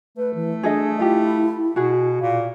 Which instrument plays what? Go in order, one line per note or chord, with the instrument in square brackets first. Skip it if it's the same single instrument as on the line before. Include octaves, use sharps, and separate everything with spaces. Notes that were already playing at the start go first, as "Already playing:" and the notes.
[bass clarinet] A3 [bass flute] B4
[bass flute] E3
[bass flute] D4 [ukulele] G#4 A4 D#5
[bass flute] E4 [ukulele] F4 G4
[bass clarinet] B2 [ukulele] F#4 G#4
[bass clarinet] A#2 [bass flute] F5